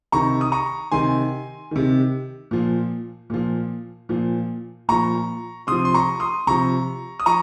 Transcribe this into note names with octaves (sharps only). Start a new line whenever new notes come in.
C3 D#3 A#5 C#6
D#6
A#5 C#6
C3 D#3 G#5 C6
C3 D#3
A#2 F3
A#2 F3
A#2 F3
A#2 F3 A#5 C#6
C3 F3 C6 D#6
C6
A#5 C#6
C6 D#6
C3 F3 A#5 C#6
D#6
F3 A#5 C#6